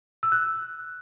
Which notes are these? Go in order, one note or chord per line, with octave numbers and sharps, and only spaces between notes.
E6
F#6